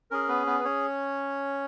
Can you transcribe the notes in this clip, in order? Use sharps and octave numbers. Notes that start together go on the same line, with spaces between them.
C#4 G#4 A#4
B3 B4
B3 B4
B4
C#4 C#5